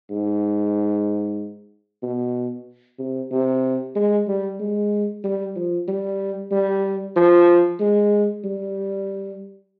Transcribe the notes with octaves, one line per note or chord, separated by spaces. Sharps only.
G#2
B2
C3
C3
G#3
G3
G#3
G3
F3
G3
G3
F3
G#3
G3